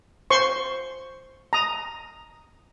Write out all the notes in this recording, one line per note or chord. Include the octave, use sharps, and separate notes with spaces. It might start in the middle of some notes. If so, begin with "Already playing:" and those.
C5 C6 C#6
A#5 D#6